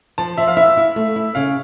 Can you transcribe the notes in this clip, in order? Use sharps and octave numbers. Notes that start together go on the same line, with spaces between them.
F3 A5
F3 E5
F5
E4 E5
E4
A3
E4
C#3 F5